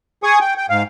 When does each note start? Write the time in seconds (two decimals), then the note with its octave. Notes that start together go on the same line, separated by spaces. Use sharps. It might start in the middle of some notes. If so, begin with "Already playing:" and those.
0.23 G#4 G#5 C#6 D#6
0.41 G5
0.57 G5
0.70 G#2 F5